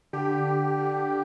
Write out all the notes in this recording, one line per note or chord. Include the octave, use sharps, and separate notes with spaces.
D3 G4
D3
D3